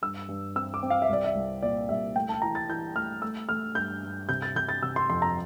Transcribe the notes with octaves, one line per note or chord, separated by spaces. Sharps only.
G2 E6
G2
C4 E6
D6
C4
F5
E5
C2 D5
E5
C2
A#2 D5
C2 E5
A3 G5
A5
E3 A#5
A6
E3 G6
A3 F6
A3 E6
A3 F6
G2 G6
G2
C3 G6
A6
C3 G6
A6
C3 E6
C6
F2 C6
A#5